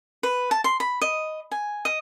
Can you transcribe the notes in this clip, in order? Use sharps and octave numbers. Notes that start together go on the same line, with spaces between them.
B4
A5
C6
B5
D#5
G#5
D#5